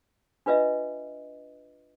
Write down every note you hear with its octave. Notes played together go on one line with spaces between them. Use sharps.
D4 F4 B4 D#5 E5